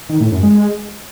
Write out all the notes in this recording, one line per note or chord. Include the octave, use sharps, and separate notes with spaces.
D#3
A2
F#2
G#3